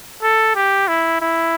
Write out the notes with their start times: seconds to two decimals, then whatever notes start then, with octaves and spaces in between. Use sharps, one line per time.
0.22 A4
0.55 G4
0.88 E4
1.21 E4